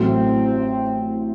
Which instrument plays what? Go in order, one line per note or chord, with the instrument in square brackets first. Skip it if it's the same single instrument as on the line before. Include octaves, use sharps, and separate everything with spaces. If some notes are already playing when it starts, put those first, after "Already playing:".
Already playing: [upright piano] A1 A2 F#3 A3 [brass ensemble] C4